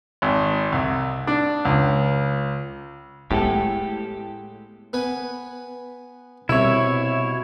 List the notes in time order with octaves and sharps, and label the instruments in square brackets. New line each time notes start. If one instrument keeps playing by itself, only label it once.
[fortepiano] G#1
C2
D4
C#2
[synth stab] A2 [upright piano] G#3 B3 [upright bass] A3 [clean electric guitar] G4 A4
[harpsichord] B3 B4 G#5
[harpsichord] C2 E5 [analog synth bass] B2 [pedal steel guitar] E4 C#5